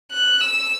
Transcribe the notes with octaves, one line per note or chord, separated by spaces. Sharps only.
F#6
E6